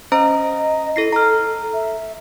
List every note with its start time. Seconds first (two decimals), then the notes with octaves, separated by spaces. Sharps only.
0.12 C#4 C5 D#5 A#5
0.96 E4 A4 A#6 C7
1.12 A4 A#5 F6
1.73 E5